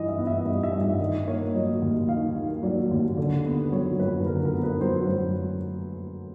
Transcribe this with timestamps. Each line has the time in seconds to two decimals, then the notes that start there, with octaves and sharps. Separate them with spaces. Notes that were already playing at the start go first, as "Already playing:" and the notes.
Already playing: G2 E3 D#5
0.08 E5
0.18 B3
0.27 E5
0.45 G3 D#5
0.63 E5
0.72 G2
0.81 E5
0.99 D#3 D#5
1.27 A#3 C#5
1.55 F#3 D#5
1.82 D#2
2.09 D#3 F5
2.36 A#3
2.63 F#3 D5
2.91 D#2
3.17 D3
3.45 B3
3.72 F#3 C#5
3.99 F#2 B4
4.26 D3 A#4
4.45 A#4
4.54 B3
4.63 B4
4.81 F#3 C5
5.08 F#2